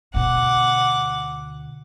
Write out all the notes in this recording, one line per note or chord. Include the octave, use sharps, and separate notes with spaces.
D2 B2 F#5 D6